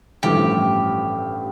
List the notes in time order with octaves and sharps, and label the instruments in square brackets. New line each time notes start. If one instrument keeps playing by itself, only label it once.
[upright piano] A1 G2 F3 A3 E4 [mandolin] G4